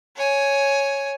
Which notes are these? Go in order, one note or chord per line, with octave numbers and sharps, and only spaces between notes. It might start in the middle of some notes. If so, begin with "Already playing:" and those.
C#5 G#5